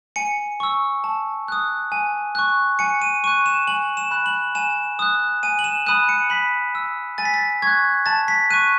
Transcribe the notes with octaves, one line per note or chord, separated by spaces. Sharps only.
G#5 C#7
C#6 E6
A5
D#6 F#6
G#5
C#6 F#6
G#5 C#7
D#7
C#6 F#6 D#7
E7
G#5 F#7
E7
B5 F#6
F#7
G#5 E7
D#6 F#6
G#5 D#7
F#7
E7
B5 D#6 F#6 D#7
C#7
B5 B6
E6
G#5 A6
B6
A6
C#6 F#6 G#6
A5 A6
B6
C#6 F#6 D#7